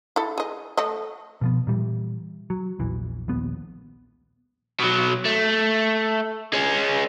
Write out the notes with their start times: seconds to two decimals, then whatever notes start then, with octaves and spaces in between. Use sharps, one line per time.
0.16 E4 A4
0.38 G#4 D#5
0.77 A3 A4 D#5
1.41 B2 F3 B3
1.67 A#2 E3 G3
2.50 F#3
2.79 A#1 E2 E3
3.28 D#1 A#1 B3
4.80 B2 F#3
5.25 A3
6.53 G#3 C#4